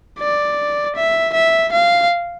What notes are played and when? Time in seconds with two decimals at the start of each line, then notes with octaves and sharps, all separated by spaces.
0.19 D5
0.96 E5
1.34 E5
1.72 F5